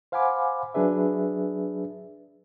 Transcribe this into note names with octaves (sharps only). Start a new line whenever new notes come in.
C5 F5 F#5 G#5 B5 D6
F#3 D4 G#4 B4 E5